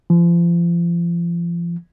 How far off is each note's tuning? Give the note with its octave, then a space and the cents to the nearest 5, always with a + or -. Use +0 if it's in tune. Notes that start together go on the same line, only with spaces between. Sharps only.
F3 -35